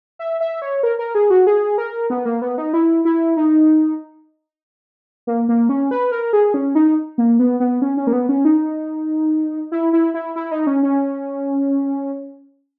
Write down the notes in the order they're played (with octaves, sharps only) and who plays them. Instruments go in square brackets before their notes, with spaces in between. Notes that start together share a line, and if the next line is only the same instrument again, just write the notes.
[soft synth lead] E5
E5
C#5
A#4
A#4
G#4
F#4
G#4
A#4
B3
A#3
B3
D#4
E4
E4
D#4
A#3
A#3
C#4
B4
A#4
G#4
C#4
D#4
A#3
B3
B3
C#4
C#4
A#3
B3
C#4
D#4
E4
E4
E4
E4
D#4
C#4
C#4